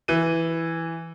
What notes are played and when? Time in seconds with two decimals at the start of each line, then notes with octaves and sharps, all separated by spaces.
0.08 E3 D#7